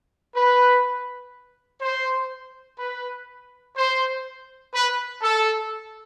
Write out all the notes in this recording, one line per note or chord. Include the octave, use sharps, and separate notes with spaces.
B4
C5
B4
C5
B4
A4